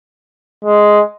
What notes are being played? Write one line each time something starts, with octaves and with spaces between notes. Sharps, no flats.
G#3